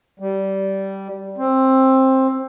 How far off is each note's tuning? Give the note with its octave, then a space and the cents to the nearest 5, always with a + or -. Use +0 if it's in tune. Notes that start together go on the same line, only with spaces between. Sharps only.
G3 -15
C4 +15